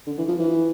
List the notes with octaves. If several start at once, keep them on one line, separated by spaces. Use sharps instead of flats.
D3
E3
F3
E3